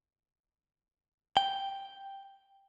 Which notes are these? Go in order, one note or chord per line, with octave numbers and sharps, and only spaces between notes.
G5